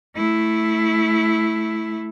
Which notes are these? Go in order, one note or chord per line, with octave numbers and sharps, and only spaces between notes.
A3 E4